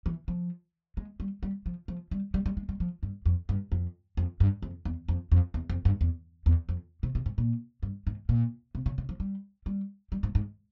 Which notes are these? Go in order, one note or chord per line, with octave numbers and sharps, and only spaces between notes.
E3
F3
G#3
G3
G3
F3
F3
G3
G3
G3
G#3
G3
F3
G2
F2
G2
F2
F2
G2
F2
E2
F2
F2
E2
F2
G2
E2
E2
F2
C3
C3
G#2
A#2
G2
G#2
A#2
C3
C#3
C#3
F3
G3
G3
G3
G#2
G#2